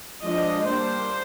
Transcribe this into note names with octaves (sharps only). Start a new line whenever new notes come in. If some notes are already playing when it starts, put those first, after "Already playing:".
F3 G#3 D4 D#5
G3 A#3 D4 C5